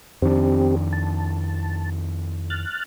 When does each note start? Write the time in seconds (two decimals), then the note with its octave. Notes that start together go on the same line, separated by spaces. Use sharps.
0.22 F2 D#3 C4 D4 G4
0.93 A5
2.50 F6 F#6 A6